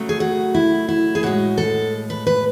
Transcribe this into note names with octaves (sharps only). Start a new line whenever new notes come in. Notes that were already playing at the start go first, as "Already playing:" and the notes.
Already playing: C#3 F#3 A3
G#4
F#4
E4
E4
G#4
A2 G#3 F#4
A4
B4
B4